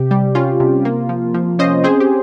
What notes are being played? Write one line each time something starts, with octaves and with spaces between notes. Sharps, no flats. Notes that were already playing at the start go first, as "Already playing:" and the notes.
Already playing: C3 G4
G3
C#4 F4
C3
A#3
F3
F3
C#4 C5 D#5
C4 G#4 C5
G4